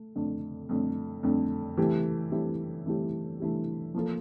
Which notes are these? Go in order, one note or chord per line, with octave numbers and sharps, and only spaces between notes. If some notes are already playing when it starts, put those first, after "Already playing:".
Already playing: A3
F2 D3 A3
F2 D3 A3
F2 D3 A3
E3 A3 E4 G4
E3 A3 E4 G4
E3 A3 E4 G4
E3 A3 E4 G4
F3 A#3 F4 A4